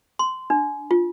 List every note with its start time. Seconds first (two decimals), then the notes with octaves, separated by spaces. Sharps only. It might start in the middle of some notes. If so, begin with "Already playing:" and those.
0.19 C6
0.50 D4
0.91 F4